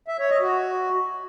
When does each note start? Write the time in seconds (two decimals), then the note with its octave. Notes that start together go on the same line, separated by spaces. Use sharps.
0.08 E5
0.19 C#5
0.30 D#5
0.41 F#4